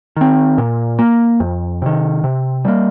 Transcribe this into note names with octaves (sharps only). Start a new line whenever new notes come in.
D#3 C4
A#2
A#3
F2
C3 D#3
C3
G3 A#3